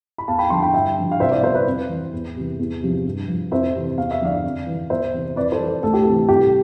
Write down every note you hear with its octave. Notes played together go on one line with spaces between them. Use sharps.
B5
E2 F5 A5
G5 B5
D3 F3 A5 C6
G5 B5
G2 E5 G5
D3 F3
F5
C2 C5 E5
D5 F5
B2 C5 E5
B4 D5
F2
E3
E2
C3 E3
E2
C3 F3
G2
F3
F2 C5 E5
C3 E3
E2 F5
E5
D3 F3 D5 F5
F2
E3
E2 C5 E5
C3 E3
F2 B4 D5
A4 C5
E3
A4
D2 A4
G4
C3 A4
E3
C2 G4